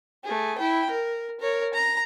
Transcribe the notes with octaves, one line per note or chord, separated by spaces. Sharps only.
A3 G#4
E4 G5
A#4
A#4 C#5
A#5